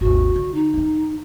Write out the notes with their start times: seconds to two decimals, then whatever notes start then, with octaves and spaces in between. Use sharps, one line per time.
0.01 G#1 D#2 F#4
0.36 D3
0.54 D#4
0.74 F#2 D#3